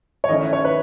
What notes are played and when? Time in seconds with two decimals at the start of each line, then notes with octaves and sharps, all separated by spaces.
0.24 C#5
0.29 D#3 A3 C#4 E4 D#5
0.41 E5
0.53 C#5
0.64 B4